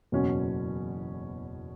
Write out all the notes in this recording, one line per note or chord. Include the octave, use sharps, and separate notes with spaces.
F#1 E2 B2 F#3 C#4